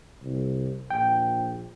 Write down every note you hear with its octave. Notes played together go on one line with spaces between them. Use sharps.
C2
A#1 G5